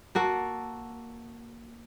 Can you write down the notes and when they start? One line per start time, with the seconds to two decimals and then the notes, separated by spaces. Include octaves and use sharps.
0.15 A#3 F#4 A4